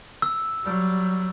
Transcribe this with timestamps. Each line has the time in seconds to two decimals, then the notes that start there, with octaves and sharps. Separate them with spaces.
0.22 E6
0.63 F#3 G3